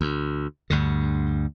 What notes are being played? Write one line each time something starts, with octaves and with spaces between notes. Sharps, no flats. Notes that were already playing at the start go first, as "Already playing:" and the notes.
D2
D2 G2 D3